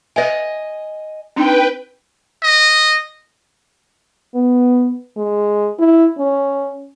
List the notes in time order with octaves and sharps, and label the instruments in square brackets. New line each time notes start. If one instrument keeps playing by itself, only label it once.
[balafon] B4 E5 [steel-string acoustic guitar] D#5 G#5
[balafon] C4 D4 D#4 [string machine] B4 G5
[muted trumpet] D#5
[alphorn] B3
G#3
E4
C#4